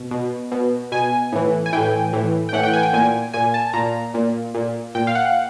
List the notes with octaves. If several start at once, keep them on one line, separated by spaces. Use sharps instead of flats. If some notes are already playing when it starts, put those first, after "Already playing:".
Already playing: B2
B2
B2
B2 G#5
A2 E3
G#5
A2 E3 G5
A2 E3
G5
A2 E3 F#5
G5
G#5
G5
A#2 G#5
A#2 G#5
A5
A#2 A#5
A#2
A#2
A#2 G5
F5
F#5